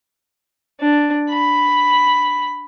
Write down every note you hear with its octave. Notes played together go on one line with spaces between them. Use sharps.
D4
B5